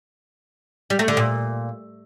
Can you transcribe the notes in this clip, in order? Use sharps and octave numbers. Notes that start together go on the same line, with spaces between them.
G3
A3
D3
A#2